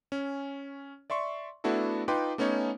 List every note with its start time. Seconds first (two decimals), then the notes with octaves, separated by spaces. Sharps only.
0.12 C#4
1.10 D5 E5 C6 C#6
1.64 A3 B3 D4 E4 F#4 A4
2.08 D#4 F4 B4 G5 C6 D6
2.38 A3 B3 C#4 D#4 C#5